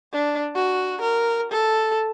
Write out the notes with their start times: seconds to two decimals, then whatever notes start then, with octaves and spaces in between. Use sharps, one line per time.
0.13 D4
0.56 F#4
1.01 A#4
1.52 A4